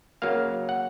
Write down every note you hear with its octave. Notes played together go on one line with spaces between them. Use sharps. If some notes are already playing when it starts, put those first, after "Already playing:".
C#3 F#3 A#3 F5
F#5